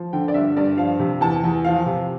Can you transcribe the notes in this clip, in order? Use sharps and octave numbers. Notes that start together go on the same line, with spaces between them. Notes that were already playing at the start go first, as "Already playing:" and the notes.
Already playing: F3
D3 G5
D5
G2 E5
G2 D5
F3 F5
C3
E2 A5
E2
F3 F5
C3